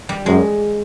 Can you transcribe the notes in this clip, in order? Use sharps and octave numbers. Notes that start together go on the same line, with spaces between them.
G3
F#2 G#3